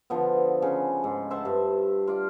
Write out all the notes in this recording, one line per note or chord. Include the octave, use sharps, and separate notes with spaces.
D3 F3 B3
C#3
G#2 F4
C5 E5 F#5 A5
G2
F4 D5 F5